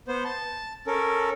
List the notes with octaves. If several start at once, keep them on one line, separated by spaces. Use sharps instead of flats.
B3 C5
A5
C#4 A4 A#4